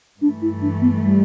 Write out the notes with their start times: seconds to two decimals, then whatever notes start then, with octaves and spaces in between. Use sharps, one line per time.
0.21 G2 E3 A3 D4
0.42 E4
0.62 D4
0.81 B3
1.02 G3